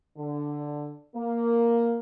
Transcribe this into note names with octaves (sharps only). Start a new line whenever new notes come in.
D3
A#3